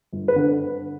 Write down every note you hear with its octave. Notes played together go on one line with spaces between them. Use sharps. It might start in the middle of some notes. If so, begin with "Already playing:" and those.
G1
B4
D3